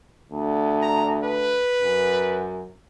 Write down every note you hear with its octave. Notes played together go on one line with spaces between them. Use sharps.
D2
A#5
B4
F#2